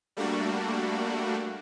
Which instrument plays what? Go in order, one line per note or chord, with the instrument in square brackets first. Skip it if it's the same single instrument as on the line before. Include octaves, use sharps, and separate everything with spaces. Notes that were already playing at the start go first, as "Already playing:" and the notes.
[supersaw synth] G3 A3 A#3 D4 F#4